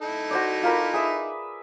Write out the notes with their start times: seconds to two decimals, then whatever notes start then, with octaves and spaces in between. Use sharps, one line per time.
0.02 D#4 E4 A4
0.31 F#4 C5 D5
0.63 F4 A#4 B5
0.93 G#4 B4 E5